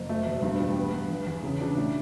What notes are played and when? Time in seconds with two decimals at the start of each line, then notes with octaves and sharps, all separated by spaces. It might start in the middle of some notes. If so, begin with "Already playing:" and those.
Already playing: F#1
0.09 A3
0.26 E1
0.42 G2
0.59 G3
0.77 B3
0.94 G2
1.09 E2
1.27 E2
1.44 C#3
1.61 D4
1.77 A2